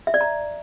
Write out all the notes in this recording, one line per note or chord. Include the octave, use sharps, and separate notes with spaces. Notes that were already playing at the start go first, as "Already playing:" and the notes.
E5
D5
A#5